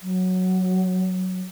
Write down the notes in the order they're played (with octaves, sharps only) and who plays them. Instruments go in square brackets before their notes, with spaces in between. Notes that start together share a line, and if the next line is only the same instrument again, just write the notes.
[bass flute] F#3